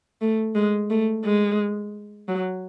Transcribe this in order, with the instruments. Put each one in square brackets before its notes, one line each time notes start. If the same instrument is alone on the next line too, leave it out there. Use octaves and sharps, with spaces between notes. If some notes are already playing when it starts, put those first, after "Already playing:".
[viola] A3
G#3
A3
G#3
F#3